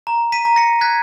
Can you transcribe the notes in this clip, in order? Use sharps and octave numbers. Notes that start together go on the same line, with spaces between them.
A#5
B6 D#7
A#5
A#6 C#7
F#6 G#6 B6